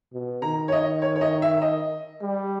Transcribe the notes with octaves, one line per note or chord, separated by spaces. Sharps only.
B2
D#3 A#5
C#5
D#5
C#5
C#5
D#5
E5
D#5
G3